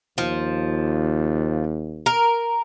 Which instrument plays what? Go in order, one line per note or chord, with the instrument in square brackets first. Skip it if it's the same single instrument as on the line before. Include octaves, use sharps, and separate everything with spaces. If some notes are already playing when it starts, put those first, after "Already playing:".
[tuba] D#2 [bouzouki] F3
[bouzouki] A#4